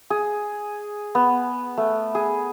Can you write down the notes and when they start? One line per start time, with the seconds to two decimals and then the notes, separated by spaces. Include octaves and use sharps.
0.10 G#4
1.15 B3
1.77 A3
2.15 G#4